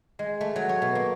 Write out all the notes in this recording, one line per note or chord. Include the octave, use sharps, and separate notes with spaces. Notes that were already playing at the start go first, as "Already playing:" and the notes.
G#3
A3
F#3
C#5
B2
A#3